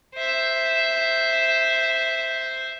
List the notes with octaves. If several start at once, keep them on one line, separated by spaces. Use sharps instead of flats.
C5 E5